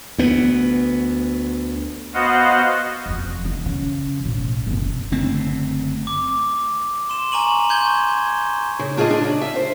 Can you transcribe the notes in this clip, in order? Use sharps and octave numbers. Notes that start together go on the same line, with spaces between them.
D2 B3
B3 F#4 C5 D#5 F5 F#5
F1 F3
D3
C#3
B1 A2
F#1 C3
F#1 D3 A3 C4
D6
C6 E7
G#5 A#5 C#6 D#7 F#7
C6 C#6 G6 G#6 G7
C#3
D4 F4 G#4 B4 D#5
D4
C#3
E5
C5